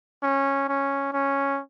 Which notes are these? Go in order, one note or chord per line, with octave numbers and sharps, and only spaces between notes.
C#4
C#4
C#4